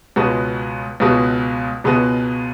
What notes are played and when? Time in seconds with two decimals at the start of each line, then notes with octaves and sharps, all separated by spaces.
0.16 C#2 B2 G#3 B3 F#4
1.00 C#2 B2 G#3 B3 F#4
1.84 C#2 B2 G#3 B3 F#4